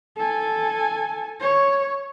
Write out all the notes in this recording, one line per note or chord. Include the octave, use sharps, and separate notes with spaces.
A4 G#5
C#5